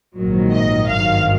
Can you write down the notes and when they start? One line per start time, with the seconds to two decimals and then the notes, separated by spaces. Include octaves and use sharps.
0.14 A#1 G#2 D#3 F#3
0.50 D#5
0.87 G#1 G2 D#3 F#3 F5